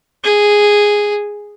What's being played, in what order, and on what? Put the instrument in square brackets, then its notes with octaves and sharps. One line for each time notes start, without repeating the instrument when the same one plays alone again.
[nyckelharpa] G#4